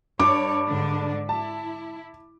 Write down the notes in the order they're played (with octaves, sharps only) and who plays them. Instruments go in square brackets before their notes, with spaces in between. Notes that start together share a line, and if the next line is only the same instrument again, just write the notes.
[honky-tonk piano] G2 [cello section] C#5 D5 [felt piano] D6
[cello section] G#2 D3 D4
[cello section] E4 [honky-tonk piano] A5